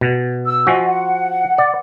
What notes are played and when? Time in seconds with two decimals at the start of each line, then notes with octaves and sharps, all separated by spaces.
0.01 B2
0.46 E6
0.67 F3 F#4 D#5 G#5
0.86 F#5
1.58 D5